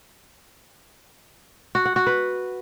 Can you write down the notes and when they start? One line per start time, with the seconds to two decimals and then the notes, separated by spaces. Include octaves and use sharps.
1.75 F#4
1.85 F#5
1.96 F#4
2.07 B4